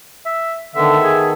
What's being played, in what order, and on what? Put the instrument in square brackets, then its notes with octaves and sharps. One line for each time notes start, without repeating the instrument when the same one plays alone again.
[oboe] E5
[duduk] D3 [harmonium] D#3 B3 A4 [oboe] E5
[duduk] G#4